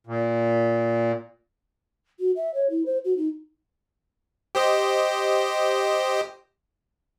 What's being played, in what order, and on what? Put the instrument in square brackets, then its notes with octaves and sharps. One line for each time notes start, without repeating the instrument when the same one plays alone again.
[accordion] A#2
[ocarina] F#4
E5
C#5
E4
C5
F#4
D#4
[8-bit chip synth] G4 C5 D#5